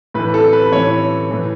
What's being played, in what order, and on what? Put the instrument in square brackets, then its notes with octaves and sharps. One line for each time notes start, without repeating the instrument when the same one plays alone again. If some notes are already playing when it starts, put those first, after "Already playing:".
[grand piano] A2 B4
E3
A4
B4
A2 E3 C#5
A2 E3